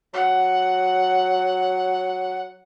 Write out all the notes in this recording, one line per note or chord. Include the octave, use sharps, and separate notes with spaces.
F#3 F#5